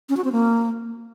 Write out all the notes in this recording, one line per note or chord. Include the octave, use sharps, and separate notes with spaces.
C#4
F#4
C4
A#3